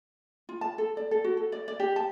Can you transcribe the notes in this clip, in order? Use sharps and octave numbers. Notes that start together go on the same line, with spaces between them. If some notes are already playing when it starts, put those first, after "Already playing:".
F4
A5
A4
D5
A4
F#4
A4
D5
D5
G4
A5